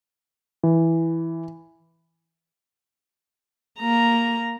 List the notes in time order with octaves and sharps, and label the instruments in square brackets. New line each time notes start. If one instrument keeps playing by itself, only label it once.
[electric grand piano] E3
[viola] A#3 A#5